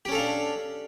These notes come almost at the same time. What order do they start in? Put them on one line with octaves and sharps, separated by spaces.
G4 C#4 A4 F5 D4